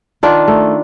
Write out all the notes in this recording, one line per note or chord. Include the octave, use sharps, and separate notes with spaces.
D#3 D4 F4
A3